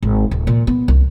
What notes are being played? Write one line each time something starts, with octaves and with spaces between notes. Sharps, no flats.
G#1
D1
A#2
B3
C2